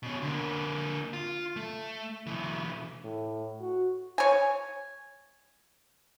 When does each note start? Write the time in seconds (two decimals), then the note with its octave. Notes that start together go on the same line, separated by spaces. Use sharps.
0.03 B2 C#4
0.22 D3 A#3
1.13 F4
1.56 A3
2.26 B1 E3
3.04 A2
3.61 F#4
4.18 C#5 G#5